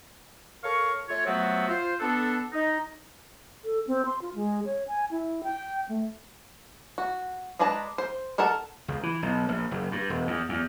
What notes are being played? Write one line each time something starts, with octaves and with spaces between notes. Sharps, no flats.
A4 A#4 C#5 F5 C#6
A3 F4 A4 C#5
F3 F#3 A3 B3 C4 F#4
F4 C5
B3 D4 A4
D#4
A4
C4
C6
F4
G#3
C#5
G#5
E4
G5
A3
F#4
G#3 D4 B4 A5 A#5
C5
A4 A#4 F#5 A5
C#2
E3
B1
A#1
F#1
G2
E1
E2
E2